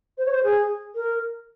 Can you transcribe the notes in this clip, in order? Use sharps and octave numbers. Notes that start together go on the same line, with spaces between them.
C5
C#5
C5
G#4
A#4